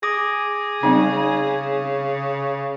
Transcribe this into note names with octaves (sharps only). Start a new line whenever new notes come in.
G#4 D6 D#6 A#6
C#3 G3 C4 D#4